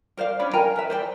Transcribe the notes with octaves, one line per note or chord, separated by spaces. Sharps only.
A#4 C5 D5 F5
C#4 D4 D5 B5
A#4 G5 G#5 A#5
A#4 B4 E5
C5 D5 G5